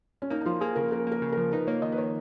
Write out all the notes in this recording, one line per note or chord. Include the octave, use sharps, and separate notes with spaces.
C#4
A#3 D#4
D#4
F3 F4
A#3 G#4
C#3 A#4
C#3 A#4
A#3 A#4
C#3
A#4
F3
D#4 B4
A#3 C#5
D#3 D#5
B4
D#3 C#5